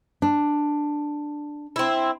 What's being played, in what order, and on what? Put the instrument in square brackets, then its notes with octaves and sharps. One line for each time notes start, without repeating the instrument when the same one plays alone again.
[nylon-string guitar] D4
[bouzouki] C4 E4